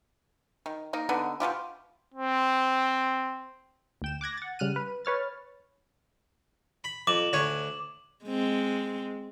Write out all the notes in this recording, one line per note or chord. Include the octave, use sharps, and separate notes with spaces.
D#3
A#3 D#4 A#4
D3 B3 D#4
B2 G3 F4 G4
C4
D2 G5 E7
D6 F#6 G#6 A#6
F#5 A6
C#3 G3 F6 F#6 D#7
B4
B4 C#5 F6 A6
B5
F2 D6 E7 F#7
D2 C#5 G#5
G#3 C4